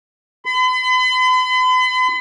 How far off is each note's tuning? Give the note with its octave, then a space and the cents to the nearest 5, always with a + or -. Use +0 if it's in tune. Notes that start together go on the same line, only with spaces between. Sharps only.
B5 +45